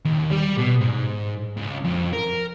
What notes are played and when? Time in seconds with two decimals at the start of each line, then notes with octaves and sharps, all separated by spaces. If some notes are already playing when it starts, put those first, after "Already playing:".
0.05 D#2
0.31 G3
0.58 B2
0.81 G#2
1.57 C#2
1.85 F2
2.13 A#4